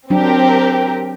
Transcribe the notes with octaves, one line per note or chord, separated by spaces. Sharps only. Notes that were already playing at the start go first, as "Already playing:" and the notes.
F#3 C4 D4 G4 A#4